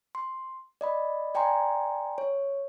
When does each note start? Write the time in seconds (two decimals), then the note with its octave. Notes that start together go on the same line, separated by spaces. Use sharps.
0.15 C6
0.81 D5 D#5 B5
1.35 D5 G5 G#5 A#5 C6
2.18 C#5